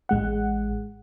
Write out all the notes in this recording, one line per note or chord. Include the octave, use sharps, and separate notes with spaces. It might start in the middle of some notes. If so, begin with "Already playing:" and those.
A1 G#3 F#5